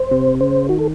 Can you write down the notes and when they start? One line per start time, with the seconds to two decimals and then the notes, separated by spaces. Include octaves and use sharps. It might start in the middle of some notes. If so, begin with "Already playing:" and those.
Already playing: C5
0.11 C3
0.40 C#3 C5
0.69 D#3 F#4
0.79 A4